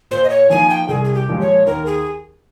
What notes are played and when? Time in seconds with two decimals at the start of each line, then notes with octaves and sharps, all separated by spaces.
0.11 A#2 C5
0.24 D#5
0.30 C#5
0.50 F3 A#3 D#4 G#5
0.70 G5
0.89 C2 G#4
1.04 G#4
1.14 G4
1.28 A#2 F3 G#3
1.41 C#5
1.66 D#2 A#4
1.86 G#4